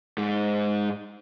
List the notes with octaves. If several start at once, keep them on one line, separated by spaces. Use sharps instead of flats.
G#2 G#3